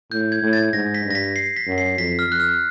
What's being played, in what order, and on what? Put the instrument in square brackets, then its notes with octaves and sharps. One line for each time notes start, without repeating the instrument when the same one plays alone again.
[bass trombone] A2 [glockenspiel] G6
[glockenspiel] G#6
[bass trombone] A2
[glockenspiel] A6
[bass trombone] G#2 [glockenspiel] A#6
[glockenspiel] B6
[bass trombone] G2
[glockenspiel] A#6
B6
C7
B6
[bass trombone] F#2
[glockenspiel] C7
[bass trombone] F2 [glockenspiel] B6
[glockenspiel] F6
[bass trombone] F2 [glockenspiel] F#6
[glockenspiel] F6